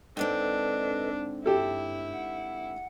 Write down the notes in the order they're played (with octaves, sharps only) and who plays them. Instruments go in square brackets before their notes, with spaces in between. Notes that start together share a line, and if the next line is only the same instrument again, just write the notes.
[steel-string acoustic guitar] G#2 D3 C4 [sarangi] D4 [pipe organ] A4 B4 D#5
[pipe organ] G2 [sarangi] E4 [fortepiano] G4 A4
[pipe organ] F#5